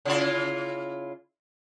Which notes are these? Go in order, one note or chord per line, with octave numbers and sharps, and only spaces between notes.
C#3 E4 F4